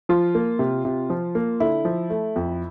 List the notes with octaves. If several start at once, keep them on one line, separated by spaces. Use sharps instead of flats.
F3 F4
A#3
C3
C3
F3
A#3
D3 E4
F3
A3
F2